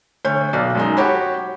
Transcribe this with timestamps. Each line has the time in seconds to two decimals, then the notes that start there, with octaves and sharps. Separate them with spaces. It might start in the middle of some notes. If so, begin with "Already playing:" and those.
0.25 D2 C#5 G6
0.53 B1 B2 D5
0.75 F#2 G#3 D#4
0.97 F#4 G4 C#5 B5